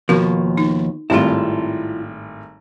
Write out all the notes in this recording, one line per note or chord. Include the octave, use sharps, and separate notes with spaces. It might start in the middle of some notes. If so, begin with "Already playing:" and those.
D#2 B2 F3 F#4 A#4
D#4
G#1 A2 G3 C4 E4 F4 F5